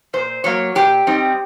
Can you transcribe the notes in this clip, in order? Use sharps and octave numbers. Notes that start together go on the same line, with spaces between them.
A#2 C5
F#3 A#3 C#5
A#2 G4
G3 C4 D#4